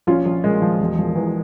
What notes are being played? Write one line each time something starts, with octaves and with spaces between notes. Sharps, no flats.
A#1 C#4 F4
A#1
A#2 G#3
F3
E1
F3
E2